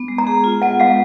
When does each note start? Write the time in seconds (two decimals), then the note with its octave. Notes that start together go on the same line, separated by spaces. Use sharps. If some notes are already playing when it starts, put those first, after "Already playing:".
Already playing: B3
0.08 G#3
0.18 A#5
0.27 G#4
0.44 F4
0.62 B3 F#5
0.80 G#3 F5